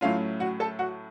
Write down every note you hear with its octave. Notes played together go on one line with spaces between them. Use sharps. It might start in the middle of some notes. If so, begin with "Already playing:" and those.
A2 F#3 A3 C#4 F4 F5
F#4 F#5
A4 A5
F#4 F#5